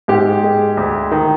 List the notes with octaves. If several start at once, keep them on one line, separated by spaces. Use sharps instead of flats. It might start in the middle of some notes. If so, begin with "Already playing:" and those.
G#2 G4
G#3
D2
D#3